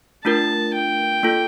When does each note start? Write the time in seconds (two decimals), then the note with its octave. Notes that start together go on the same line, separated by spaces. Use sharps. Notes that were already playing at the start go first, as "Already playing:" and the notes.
0.25 A3 D4 F4 A#4 A5
0.74 G5
1.23 A#3 F4 A4